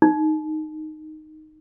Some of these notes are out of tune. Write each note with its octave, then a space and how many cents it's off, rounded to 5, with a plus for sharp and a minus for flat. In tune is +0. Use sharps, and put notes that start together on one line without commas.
D#4 -5